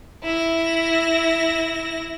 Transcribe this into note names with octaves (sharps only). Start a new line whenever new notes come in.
E4 A#6